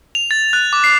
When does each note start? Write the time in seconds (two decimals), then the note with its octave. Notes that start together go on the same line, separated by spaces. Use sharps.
0.15 F7
0.31 A6
0.53 F#6
0.73 D6
0.84 C7